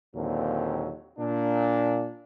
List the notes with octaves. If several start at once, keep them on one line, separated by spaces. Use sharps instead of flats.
D#2 A#2 D3 F#3 C4
A#2 D4